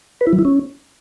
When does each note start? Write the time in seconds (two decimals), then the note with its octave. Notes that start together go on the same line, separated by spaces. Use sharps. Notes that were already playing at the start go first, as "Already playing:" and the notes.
0.21 B4
0.27 E4
0.33 F#3
0.39 E4
0.45 C#4